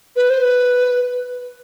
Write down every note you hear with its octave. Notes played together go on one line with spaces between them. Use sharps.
B4
C5
B4